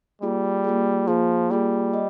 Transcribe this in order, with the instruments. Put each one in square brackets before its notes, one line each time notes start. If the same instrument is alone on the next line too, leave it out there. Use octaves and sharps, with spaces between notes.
[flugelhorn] G3 [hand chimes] A#3 F4 G#4
[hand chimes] A#3 F4 G#4
[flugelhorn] F3 [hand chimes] A#3 F4 G#4
[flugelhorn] G3 [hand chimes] A#3 F4 G#4
[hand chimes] D#5